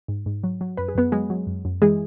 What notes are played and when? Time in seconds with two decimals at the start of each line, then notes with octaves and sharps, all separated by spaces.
0.08 G#2
0.26 G#2
0.44 F#3
0.61 F#3
0.77 F#2 B4
0.88 G#4
0.95 F#2 B3 B4
1.12 F#3 G#3 G#4
1.30 F#3
1.47 F#2
1.65 F#2
1.82 E3 G#3 G#4